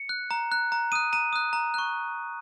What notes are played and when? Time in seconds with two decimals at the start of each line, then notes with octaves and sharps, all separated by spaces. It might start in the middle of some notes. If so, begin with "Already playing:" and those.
Already playing: C#7
0.09 F#6
0.31 A#5
0.52 F#6
0.72 A#5
0.92 D#6 F#6 D#7
1.13 A#5 D#7
1.33 D#6 F#6
1.53 A#5
1.74 C#6 F#6